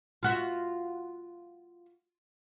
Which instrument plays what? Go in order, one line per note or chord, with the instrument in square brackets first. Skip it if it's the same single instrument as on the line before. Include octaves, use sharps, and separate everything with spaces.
[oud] F4 F#4 E5